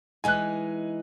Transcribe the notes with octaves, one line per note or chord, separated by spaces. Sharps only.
E3 G#3 D#4 G#5 F#6